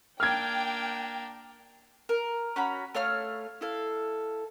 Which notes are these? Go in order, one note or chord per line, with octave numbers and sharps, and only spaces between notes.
A#3 D4 G5 F6 G#6
A#4
C#4 F#4 A#5 B5
A3 C#5 F5 F6
E4 A4 F5